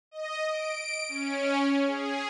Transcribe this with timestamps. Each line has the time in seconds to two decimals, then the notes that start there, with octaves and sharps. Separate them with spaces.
0.11 D#5
0.49 D7
1.09 C#4
1.87 G#4